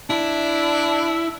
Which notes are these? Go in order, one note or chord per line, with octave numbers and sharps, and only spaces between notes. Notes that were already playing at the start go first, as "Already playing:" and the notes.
D4 E4